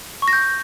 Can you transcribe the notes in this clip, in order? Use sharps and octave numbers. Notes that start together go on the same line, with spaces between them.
C#6
A#6
G6